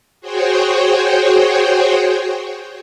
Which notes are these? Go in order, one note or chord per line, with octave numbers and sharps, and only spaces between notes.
F#4 G#4 C5 C#5 G5